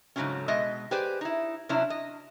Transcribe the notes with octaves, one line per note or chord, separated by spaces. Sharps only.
G#2 C#3 F3 F#3 A3 C#4
B2 G#3 D#5 E5
G4 G#4 B4 C5 D5
D#4 E4
C3 F#3 C#4 D4 E4
D#5